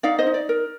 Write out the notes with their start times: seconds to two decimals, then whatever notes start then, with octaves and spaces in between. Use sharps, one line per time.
0.03 D#4 D5 F5
0.19 C5 D#5
0.27 D#4
0.34 D5
0.49 A#4